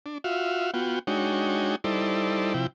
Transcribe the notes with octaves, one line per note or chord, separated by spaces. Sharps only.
D4
F4 F#4 E5 F5
B3 F4 F#4 G5
G#3 D4 D#4 F#4 C#5 G5
G3 D#4 E4 A4 C5 D5
C3 F3 E4 G5